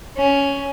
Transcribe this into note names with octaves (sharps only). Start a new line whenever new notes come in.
C#4